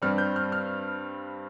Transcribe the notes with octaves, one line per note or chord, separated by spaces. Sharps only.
G2 G3 C4 F6
G6
F6
F6